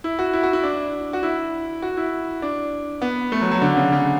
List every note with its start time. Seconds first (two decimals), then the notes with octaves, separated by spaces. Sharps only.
0.04 E4
0.19 F#4
0.33 E4
0.43 F#4
0.53 E4
0.63 D4
1.13 F#4
1.23 E4
1.82 F#4
1.97 E4
2.42 D4
3.02 B3
3.32 A3
3.41 F#3
3.51 F#3
3.62 D3
3.77 C#3
3.92 C#3